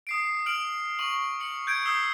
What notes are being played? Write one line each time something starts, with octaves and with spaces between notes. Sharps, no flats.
D#6 C7 D7
F6 D7 F#7
C#6 F#7
C#7 F#7
G6 G#6 D7
D#6 E6 G6 C7 G7